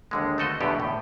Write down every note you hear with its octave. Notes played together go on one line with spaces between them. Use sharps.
D#2 D3 G#3
A3 B3 F#4 A4 D#5
E2 B2 D3 B3 G4
A2